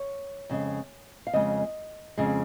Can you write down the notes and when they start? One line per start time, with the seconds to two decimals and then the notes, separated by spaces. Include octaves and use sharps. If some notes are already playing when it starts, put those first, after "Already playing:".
Already playing: C#5
0.49 F2 C#3 G#3
1.27 F5
1.33 F2 C#3 G#3 D#5
2.17 F2 C#3 G#3